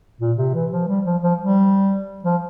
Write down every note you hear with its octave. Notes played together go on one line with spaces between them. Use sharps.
A#2
C3
E3
F3
G3
F3
F3
G3
F3